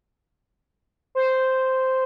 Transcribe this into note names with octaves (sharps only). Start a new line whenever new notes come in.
C5